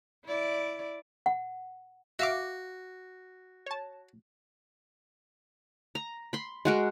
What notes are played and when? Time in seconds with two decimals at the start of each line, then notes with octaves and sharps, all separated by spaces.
0.25 E4 D5
1.26 F#5
2.19 F#4 E5 F5 D6
3.66 C#5 A5
5.95 A#5
6.33 B5 C6
6.65 G#3 F#4 A#4